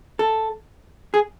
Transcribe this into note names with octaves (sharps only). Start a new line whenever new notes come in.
A4
G#4